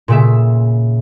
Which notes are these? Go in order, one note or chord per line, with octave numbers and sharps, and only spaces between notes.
A#2 C#3 E5